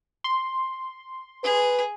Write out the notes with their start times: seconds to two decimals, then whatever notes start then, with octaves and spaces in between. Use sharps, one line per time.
0.24 C6
1.44 G#4 B4